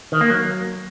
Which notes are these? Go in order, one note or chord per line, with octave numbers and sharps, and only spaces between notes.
D#3
A#3
F#3